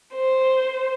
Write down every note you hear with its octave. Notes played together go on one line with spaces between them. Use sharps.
C5